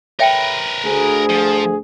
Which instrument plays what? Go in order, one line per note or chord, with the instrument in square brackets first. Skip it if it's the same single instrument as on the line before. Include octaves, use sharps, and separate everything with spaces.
[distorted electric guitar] A#4 B4 [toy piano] C#5 E5 G5
[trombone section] D2 G#4
[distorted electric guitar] F3